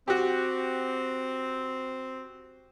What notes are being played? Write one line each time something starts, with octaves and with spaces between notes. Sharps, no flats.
C4 F#4 G4